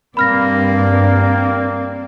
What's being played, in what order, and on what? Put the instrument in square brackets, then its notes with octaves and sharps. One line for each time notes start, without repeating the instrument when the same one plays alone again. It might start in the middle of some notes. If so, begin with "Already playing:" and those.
[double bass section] G2 [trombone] A#3 [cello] C4 D5 [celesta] B5 F6 A#6